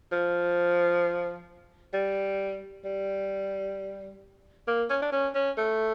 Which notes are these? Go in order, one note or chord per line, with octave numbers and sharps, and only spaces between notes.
F3
G3
G3
A#3
C#4
D4
C#4
C#4
A3